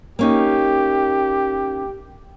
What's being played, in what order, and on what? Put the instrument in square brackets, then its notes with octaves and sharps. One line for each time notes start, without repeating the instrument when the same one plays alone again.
[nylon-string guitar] A#3 C#4 D#4 [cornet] G4